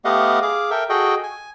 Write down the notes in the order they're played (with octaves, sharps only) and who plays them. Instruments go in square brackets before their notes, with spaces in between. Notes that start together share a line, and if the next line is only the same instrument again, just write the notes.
[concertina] A3 B3 G4 D#5 F5 F#5
G#4 F5 D6
A4 A#4 E5 G5
F#4 G#4 A4 D#5 G5
G#5